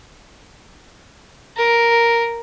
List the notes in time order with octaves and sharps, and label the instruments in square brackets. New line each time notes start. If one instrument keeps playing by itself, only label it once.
[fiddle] A#4